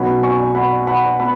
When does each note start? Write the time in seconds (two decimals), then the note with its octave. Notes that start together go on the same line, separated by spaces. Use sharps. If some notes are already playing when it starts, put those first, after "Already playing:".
Already playing: B1 B2 F#3 C#4 F#5 B5
0.23 G#5 C#6
0.55 F#5 B5
0.87 F#5 B5
1.20 B3 B5